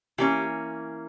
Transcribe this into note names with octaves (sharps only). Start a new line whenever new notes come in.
E3 A#3 C#4 G4